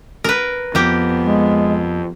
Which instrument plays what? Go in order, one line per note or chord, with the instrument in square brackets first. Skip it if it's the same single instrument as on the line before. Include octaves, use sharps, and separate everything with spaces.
[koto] A#4 B4
[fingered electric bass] F2 [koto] A#3 G4 [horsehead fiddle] B3
[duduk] G#3